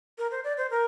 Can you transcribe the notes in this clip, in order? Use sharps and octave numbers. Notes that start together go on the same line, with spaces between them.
A#4
C5
D5
C5
A#4